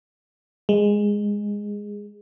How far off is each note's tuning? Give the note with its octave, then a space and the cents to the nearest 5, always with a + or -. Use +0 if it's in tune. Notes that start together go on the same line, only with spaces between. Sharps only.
G#3 -10